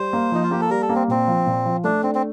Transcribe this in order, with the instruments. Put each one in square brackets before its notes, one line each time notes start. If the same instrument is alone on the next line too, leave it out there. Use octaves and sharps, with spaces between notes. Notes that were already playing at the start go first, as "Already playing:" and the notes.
Already playing: [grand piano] G3 [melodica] C5
[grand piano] A#3
[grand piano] F3 [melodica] D#4
[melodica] F4
[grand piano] A#3 [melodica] G4
[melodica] A4
[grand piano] G3 [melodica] A#4
[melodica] A4
[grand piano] A#3
[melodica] C4
[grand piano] A#2 [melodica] C4
[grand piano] F3
A#2
F3
[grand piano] A3 [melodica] D4
[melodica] C4 [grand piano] D4
[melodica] C4